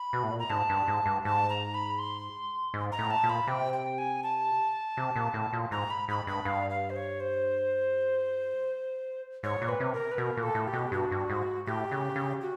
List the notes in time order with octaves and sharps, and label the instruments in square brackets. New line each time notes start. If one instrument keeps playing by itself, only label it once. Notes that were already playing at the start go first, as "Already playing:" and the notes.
Already playing: [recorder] B5
[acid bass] B2
A2
A#2
[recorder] A#5
[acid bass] G#2 [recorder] A5
[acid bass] G2
G#2
G2
[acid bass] G#2 [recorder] A5
[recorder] A#5
B5
C6
[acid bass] G#2
[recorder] A#5
[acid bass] A2
[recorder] A5
[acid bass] A#2
[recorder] B5
[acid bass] C3 [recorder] G5
[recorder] G5
G#5
A5
[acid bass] C3
A#2
A2
A#2
[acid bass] G#2 [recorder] A#5
[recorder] B5
[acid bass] G#2 [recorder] B5
[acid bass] G2 [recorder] B5
[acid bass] G2 [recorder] F5
[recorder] F5
C5
C#5
C5
[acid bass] G#2 [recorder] C#5
[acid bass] A#2
[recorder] B4
[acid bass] C3
[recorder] A#4
B4
[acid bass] B2 [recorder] A#4
[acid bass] A#2
[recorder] A4
[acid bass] A2
[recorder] G4
[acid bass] B2
[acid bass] G2 [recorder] F#4
[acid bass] G2
G#2
[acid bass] A2 [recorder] G4
[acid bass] C#3
C#3
[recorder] F#4